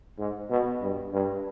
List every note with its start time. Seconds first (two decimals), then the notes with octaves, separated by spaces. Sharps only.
0.19 G#2
0.50 B2
0.81 G2
1.13 G2